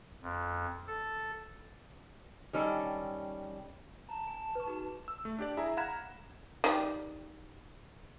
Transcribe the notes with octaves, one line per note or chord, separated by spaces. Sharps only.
F2
A4
D#3 G3 C#4 A4
A5 A#5
G#5
B4 C#6
D#4 F#4 G#4
E6
A3
D4 G4 D5
E4 G#4 E5 G#5 A#5
F5 F#5 A#5 B5 G#6 E7
D#3 F#3 G3